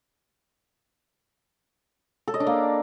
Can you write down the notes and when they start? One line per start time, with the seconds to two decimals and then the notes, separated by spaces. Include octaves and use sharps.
2.28 A4
2.34 D#5
2.40 D4
2.47 A#3